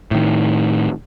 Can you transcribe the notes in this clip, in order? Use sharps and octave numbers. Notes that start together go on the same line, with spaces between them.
A2 D#3